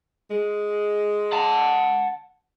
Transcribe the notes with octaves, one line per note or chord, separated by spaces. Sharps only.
G#3
F#5 A5